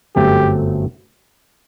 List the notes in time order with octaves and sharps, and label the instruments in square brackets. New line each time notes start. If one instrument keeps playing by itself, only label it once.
[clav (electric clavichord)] G1 F#2 F#3 A3 C4 [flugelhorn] G4